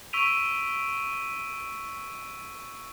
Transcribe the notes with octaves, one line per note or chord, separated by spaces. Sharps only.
C#6 E6 B6 D7 D#7 F7